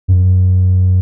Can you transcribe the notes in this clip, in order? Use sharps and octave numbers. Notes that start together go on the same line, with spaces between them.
F#2